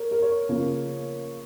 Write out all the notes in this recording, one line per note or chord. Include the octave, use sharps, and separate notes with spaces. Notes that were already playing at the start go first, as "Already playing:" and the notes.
Already playing: A#4 C#5
A#4
C#5
C#3 F3 A#3